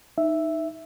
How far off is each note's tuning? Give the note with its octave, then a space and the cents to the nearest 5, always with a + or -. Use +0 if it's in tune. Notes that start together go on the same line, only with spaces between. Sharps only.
D#4 +0 E5 +0